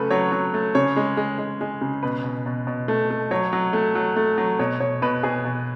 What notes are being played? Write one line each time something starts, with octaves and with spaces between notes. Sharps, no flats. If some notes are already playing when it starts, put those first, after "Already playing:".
Already playing: C#3 F#3 A3 A4 B4
F#3 C#5
F#3
A3
C#3 C#5
G#3
G#3
G#3
G#3
C#3
B2 B4
B2
B2
B2
A3
A3
F#3 C#5
F#3
A3
F#3
A3
F#3
B2 C#5
B2 C#5
B2 B4
B2 G#4
B2